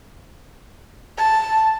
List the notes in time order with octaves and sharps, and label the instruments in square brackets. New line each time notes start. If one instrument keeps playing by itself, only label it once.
[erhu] A5